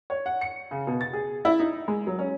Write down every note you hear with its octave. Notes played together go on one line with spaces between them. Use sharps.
C#5
F#5
C#7
C#3
B2
A6
G#4
E4
D#4
G#3
F#3
C#4